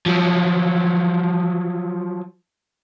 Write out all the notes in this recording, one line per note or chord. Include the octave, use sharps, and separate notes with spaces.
F3 F#3